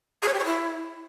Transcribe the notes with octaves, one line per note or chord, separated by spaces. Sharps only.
G#4
C#5
G4
C#5
E4